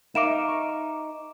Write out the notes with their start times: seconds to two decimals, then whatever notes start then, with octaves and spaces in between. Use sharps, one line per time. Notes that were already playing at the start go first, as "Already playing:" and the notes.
0.15 D#4 A#4 E5 F5 D6 D7 E7
0.48 C#6